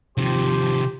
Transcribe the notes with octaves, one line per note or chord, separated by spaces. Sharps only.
C3 D#3 F3 G4 C5